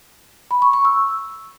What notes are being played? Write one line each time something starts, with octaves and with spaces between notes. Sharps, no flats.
B5
C#6
C#6
E6